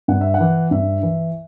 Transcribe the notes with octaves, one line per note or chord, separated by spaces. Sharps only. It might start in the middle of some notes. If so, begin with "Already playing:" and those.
G2 F#5
E5
F#5
E3
G2 E5
E3